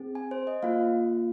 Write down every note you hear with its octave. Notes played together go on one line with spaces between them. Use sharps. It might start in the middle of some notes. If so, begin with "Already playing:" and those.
Already playing: C4 G#4
G#5
C5
D#5
A#3 F4 F5